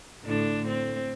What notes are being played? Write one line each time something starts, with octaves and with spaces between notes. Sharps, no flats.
A2 D3 D4
C4